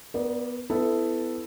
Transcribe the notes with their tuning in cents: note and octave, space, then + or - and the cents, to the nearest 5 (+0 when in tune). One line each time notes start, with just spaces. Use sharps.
B3 +0 A#4 +35 D5 +0
B3 +20 E4 +0 A4 +0